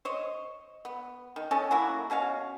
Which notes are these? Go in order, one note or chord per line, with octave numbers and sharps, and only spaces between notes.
C5 C#5 D#5
B3
D#3
C#4 A4 D#5 A5
F#3 A#3 E4 F#4
B2 C#4 F#4 F5